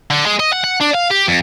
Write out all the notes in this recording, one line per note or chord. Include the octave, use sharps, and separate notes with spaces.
D3
G#3
D#5
F#5
F#5
D4
F5
G4
F2